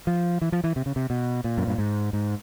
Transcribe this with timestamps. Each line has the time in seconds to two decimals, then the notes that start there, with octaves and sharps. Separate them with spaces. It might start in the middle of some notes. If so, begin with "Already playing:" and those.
0.07 F3
0.42 E3
0.52 F3
0.64 E3
0.76 C3
0.86 C#3
0.96 C3
1.10 B2
1.44 A#2
1.58 F#2
1.67 G2
1.78 G#2
2.13 G#2